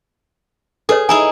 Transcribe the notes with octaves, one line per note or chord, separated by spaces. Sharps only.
G#4 A4 B4 C#5
D#4 E4 G#4 G#5